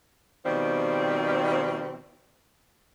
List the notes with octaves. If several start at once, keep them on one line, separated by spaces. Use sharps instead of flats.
B2 D#3 F3 G3 C4